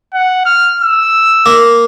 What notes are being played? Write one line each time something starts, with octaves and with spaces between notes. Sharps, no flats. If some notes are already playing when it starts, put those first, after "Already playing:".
F#5
F6
E6
A#3